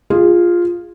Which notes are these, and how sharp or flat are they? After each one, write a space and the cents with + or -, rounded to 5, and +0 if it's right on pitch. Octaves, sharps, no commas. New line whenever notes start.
F4 +0 G#4 -20